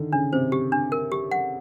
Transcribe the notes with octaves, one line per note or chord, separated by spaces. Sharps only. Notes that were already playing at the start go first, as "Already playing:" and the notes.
Already playing: D3 D#3
C#3 D4
C3 C5
G4
D4
A#4
G4
F#5